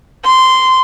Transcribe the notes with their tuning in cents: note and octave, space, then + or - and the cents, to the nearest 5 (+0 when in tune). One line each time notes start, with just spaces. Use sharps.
C6 -10